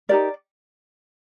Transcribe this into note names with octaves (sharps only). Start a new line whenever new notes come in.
D#4 G4 A#4 D5